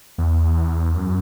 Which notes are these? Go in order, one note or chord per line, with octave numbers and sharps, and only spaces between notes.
E2
F#2